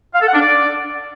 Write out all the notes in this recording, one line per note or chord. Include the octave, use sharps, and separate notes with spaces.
F5
A4
F#5
D4
D5